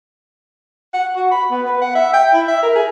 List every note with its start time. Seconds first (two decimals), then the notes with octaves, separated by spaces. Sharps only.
0.94 F#5
1.16 F#4
1.31 B5
1.51 B3
1.67 B4
1.82 F#5
1.95 E5
2.13 G5
2.33 E4
2.48 E5
2.63 A#4
2.76 G#4